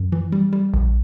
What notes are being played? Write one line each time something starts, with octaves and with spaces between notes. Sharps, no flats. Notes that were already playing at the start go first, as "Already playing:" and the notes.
Already playing: F#2
E3
G3
G3
A#1